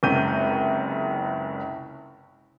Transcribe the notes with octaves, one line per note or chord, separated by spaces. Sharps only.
F#1 C#2 C3 G6 D#7